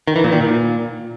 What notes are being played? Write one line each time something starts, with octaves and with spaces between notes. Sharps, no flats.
D#3
E3
A#2
D#3
A#2